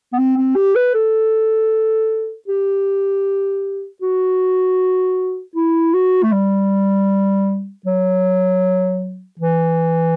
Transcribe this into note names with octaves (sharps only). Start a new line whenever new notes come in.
B3
C4
C4
G4
B4
A4
G4
F#4
E4
F#4
A3
G3
F#3
E3